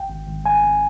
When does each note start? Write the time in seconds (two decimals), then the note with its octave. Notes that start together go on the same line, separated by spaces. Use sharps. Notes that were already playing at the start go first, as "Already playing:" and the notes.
Already playing: G#1 G5
0.10 G#1
0.28 G#1
0.45 G#1 G#5
0.63 G#1